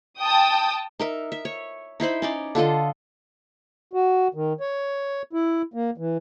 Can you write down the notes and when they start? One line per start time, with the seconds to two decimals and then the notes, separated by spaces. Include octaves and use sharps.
0.21 G5 A5 D#6
1.00 D#4 A#4 E5
1.32 E5
1.45 C#5
2.00 D#4 E4 C5 B5
2.22 C#4 D#4 D5
2.55 D3 F4 A4 D#5
3.93 F#4
4.34 D#3
4.61 C#5
5.33 E4
5.74 A#3
5.98 E3